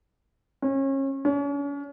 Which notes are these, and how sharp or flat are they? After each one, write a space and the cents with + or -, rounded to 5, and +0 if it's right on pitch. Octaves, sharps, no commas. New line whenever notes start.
C#4 -30
C#4 +40